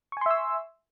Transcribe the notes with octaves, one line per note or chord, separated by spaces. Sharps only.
E5 G#5 C6 C#6 E6